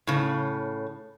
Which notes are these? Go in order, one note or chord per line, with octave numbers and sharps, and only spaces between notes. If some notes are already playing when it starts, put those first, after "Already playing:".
A2 C#3